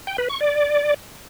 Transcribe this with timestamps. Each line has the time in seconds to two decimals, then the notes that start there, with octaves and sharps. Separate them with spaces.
0.07 G5
0.18 B4
0.29 C#6
0.41 D5